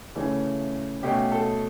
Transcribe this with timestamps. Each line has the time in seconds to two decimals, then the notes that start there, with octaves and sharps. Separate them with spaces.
0.15 C#3 E3 A3 C#4
1.03 B2 A3 C#4 G4
1.32 A4